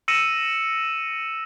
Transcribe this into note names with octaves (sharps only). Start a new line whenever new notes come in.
E6 A#6 C#7 D#7 E7